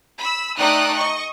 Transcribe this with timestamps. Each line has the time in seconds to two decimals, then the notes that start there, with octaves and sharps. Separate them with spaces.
0.19 B5 E6
0.59 A3 D#4 D5 G5 D#6 F#6
0.95 D#5 C#6